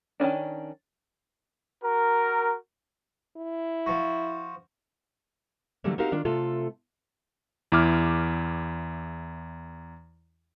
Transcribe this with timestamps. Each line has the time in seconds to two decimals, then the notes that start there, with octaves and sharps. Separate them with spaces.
0.20 D#3 E3 C#4 D4
1.83 F#4 A#4
3.37 E4
3.86 F3 F#4
5.84 D3 E3 F#3 G3 A3 A#3
5.98 C4 D#4 F#4 G4 A#4 F5
6.12 D#3 D4 F4
6.25 C3 A3 F4 A4
7.72 E2 E4 D6 F6